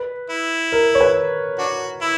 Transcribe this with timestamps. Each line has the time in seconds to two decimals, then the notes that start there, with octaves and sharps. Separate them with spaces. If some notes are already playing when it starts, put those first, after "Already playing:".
Already playing: B4
0.30 E4
0.72 A#4
0.95 C#5
1.01 B4
1.59 D4 F#4
2.01 E4